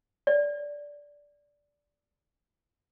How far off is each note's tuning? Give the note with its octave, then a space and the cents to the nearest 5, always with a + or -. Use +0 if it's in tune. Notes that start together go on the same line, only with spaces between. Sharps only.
D5 -10